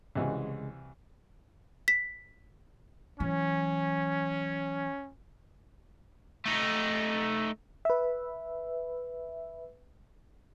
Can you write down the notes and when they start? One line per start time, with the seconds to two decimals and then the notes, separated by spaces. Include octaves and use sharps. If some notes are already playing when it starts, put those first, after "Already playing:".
0.15 C2 C#3 E3 G#3 F#4
1.88 B6
3.20 E3 F#3 C#4
6.46 A3 D#4
7.85 B4 E5